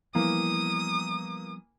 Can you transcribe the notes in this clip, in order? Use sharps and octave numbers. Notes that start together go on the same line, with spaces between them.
E3 F3 G3 A#3 B3 D#6